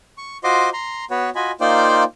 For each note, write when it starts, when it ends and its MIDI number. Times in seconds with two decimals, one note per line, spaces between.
0.18 0.37 85
0.44 0.69 65
0.44 0.69 66
0.44 0.69 72
0.44 0.69 75
0.44 0.69 84
0.44 0.69 86
0.73 1.05 82
0.73 1.05 84
1.10 1.30 59
1.10 1.30 66
1.10 1.30 71
1.10 1.30 73
1.35 1.51 65
1.35 1.51 66
1.35 1.51 75
1.35 1.51 80
1.35 1.51 83
1.61 2.04 58
1.61 2.04 63
1.61 2.04 65
1.61 2.04 72
1.61 2.04 74
1.61 2.04 79